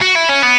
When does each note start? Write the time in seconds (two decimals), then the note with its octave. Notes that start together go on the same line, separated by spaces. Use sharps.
0.01 F#4
0.15 E4
0.29 C#4
0.42 B3